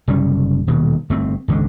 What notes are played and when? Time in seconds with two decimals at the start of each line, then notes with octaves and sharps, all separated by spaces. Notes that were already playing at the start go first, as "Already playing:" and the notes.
0.08 F#1 C3 G3 C#4
0.67 D#1 D#2 B2
1.10 G1 A3 C4
1.48 G#1 C#2 B2 D3